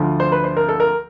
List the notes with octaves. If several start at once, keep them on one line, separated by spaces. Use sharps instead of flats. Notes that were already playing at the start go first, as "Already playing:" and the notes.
Already playing: D2 D3 F3
C5
B4
C5
A#4
A4
A#4